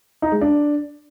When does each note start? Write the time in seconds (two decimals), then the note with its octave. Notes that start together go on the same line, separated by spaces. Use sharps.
0.22 D#4
0.32 G#3
0.41 D4